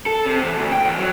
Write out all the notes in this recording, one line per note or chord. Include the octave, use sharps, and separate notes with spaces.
A4
C3
E2
D2
G5
E2
F#3